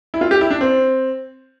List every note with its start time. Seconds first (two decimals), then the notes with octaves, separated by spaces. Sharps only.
0.14 E4
0.21 F4
0.31 G4
0.41 E4
0.51 D4
0.61 C4